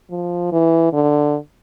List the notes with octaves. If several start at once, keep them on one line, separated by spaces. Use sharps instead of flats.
F3
E3
D3